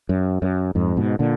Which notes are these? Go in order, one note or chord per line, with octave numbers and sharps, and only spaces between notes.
F#2
F#2
F2 G#2
G#2 B2
A#2 D3